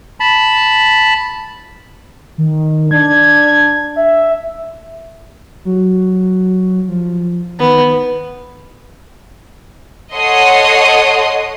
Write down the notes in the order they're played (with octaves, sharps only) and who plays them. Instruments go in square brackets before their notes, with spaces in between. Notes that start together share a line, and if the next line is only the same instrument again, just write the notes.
[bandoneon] A5 B5
[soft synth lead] D#3
[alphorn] D4 [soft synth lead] G#6
[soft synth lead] E5
F#3
F3
[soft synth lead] D#3 [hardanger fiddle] B3
[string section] A4 C#5 D#5 F#5 C6 D#6